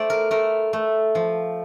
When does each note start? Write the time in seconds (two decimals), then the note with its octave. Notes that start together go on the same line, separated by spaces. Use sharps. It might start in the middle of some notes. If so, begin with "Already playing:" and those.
Already playing: A3 C5 D5
0.10 A#4
0.31 A3 A#4
0.73 A3
1.15 F3